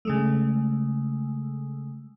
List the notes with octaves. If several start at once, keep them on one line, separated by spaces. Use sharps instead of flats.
C#3 G#3 A3